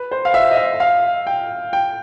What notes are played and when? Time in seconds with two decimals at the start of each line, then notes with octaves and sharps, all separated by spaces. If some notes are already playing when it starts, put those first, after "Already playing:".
Already playing: B4
0.12 C5
0.25 F5
0.34 E5
0.51 D#5
0.57 E5
0.80 F5
1.27 G5
1.73 G5